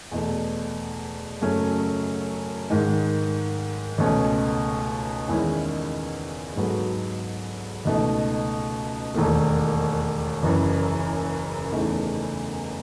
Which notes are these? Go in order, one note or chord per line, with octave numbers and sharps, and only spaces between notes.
E2 B2 A3
F#2 C#3 F#3 A3 C#4
G#2 D#3 G#3
C#2 B2 A3 C#4
E2 D#3 G#3 C#4 E4
G#2 F#3 B3 F#4 A4
C#2 B2 A3 D#4
E1 D#2 D#3 A3
F#1 F#2 E3
E2 C#3 E3 A3 D#4